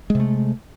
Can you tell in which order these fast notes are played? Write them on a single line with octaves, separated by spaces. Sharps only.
G#3 C3 A3